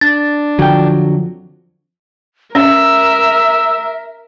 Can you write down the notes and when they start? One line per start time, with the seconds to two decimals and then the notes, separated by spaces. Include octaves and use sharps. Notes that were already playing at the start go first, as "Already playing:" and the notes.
0.01 D4 A6
0.59 F2 D3 F3 F#3 G5
2.55 C#4 A#4 E5 E6